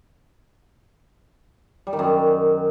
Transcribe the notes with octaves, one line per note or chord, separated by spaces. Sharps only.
G3
D#3
F#2